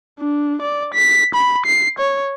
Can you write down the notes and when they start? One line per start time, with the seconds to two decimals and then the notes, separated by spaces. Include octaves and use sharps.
0.20 D4
0.62 D5
0.94 B6
1.35 B5
1.66 C7
1.99 C#5